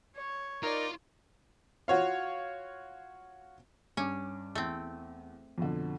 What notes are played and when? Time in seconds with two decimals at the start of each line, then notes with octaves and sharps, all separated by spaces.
0.16 C#5
0.63 D#4 F4 A#4 D5
1.88 F4 F#4 C#5 F5
3.97 G2 C#4 D6
4.55 E2 A3 C4
5.58 F2 B2 D3